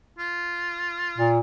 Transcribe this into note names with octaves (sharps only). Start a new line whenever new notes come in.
F4
A#2